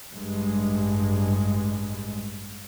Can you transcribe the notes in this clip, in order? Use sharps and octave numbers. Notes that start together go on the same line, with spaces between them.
A1 G2 G#3